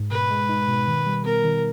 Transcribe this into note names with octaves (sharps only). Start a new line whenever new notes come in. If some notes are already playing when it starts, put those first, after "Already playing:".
Already playing: G#2
B2 B4
G#3
D#4
B2
D#3
G3
B3 A#4
D#3